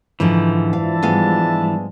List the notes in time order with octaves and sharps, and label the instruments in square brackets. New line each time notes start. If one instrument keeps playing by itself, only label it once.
[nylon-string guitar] G#2 D3 F3 [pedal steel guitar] E3
[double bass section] G#2 F3 [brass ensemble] D4 E5 A5 [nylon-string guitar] F5
[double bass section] G#2 F3 G3 [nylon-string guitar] G#3 B3 F5